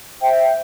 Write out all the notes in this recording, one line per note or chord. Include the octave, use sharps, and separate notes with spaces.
C5 E5 G5